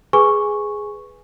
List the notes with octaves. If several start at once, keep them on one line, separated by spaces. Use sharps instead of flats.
G#4 B4 G#5 C#6